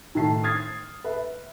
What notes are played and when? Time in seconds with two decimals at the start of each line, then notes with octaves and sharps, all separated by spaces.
0.15 A2 D#3 A5 C7
0.43 D#6 F6 G#6 A6 C7
1.04 B4 E5